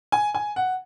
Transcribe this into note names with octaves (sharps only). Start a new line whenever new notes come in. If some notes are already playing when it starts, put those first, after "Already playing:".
G#5
G#5
F#5